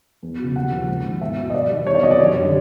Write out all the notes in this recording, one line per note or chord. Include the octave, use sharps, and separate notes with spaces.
E2
C#3 F#3
D#2 F#5
C#3 F3
G#2
D#3 G#3
E2 E5
B2 F#3
D#5
G2 D5
D#3 G3
E2 C#5
D5
C3 D#3 F#3 D#5
D5
F#2 C#5
D3 G3